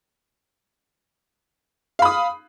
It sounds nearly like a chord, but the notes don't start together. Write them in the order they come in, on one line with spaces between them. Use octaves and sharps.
F5 B5 D#6